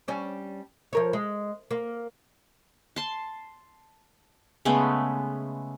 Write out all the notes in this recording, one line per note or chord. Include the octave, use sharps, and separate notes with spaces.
G3 C#4 D4
F3 A#4 C#5
G#3
A#3
A5 C6
C#3 G#3 A3 B3